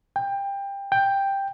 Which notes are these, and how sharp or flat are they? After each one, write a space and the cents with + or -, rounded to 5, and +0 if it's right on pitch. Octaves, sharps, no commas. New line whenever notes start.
G5 +20
G5 +5